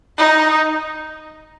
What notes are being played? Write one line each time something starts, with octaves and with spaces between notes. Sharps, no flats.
D#4